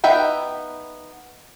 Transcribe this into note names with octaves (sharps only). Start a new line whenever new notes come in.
B3 D#4 E5 G5 B5